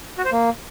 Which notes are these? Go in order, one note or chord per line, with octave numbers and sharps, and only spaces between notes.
F#4
C5
A#3